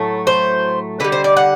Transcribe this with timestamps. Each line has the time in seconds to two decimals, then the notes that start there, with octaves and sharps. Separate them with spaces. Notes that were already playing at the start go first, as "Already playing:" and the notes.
Already playing: A2 F#3 A3
0.27 C5
1.00 D3 B4
1.04 G3
1.12 C5
1.24 D5
1.36 F#5